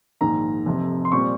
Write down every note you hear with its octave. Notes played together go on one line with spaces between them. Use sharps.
A#1 G#2 D#3 A#5
F1 F2 C3
C6
A#2 G3 C4 C#6